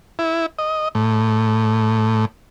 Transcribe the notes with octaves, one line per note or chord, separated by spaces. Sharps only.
E4
D#5
A2